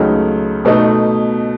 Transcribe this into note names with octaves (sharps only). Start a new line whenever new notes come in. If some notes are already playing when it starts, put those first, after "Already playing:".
Already playing: C#2 C#3 F#3 A3 D#4
B2 A3 D#4